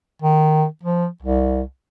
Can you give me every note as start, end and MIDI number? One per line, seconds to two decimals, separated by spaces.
0.22 0.66 51
0.83 1.07 53
1.22 1.62 36